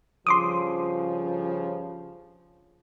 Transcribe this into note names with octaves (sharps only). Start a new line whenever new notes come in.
G2 C#3 F3 C6 D6 D#6